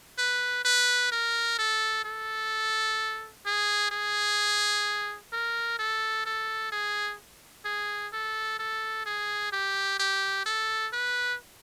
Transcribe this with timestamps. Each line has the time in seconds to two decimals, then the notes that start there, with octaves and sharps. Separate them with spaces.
0.18 B4
0.65 B4
1.12 A#4
1.59 A4
2.05 A4
3.46 G#4
3.91 G#4
5.32 A#4
5.79 A4
6.26 A4
6.72 G#4
7.65 G#4
8.13 A4
8.59 A4
9.06 G#4
9.52 G4
9.99 G4
10.46 A4
10.93 B4